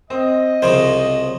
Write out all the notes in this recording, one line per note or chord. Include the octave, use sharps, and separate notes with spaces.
C4 D#5
C2 C#3 F3 C5